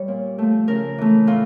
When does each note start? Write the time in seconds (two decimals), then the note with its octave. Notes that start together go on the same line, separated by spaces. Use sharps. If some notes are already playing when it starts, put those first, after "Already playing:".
Already playing: G3 C#5
0.08 A#2
0.38 F3 A3
0.68 C#3 A#4
0.98 E3 A3
1.27 A2 F4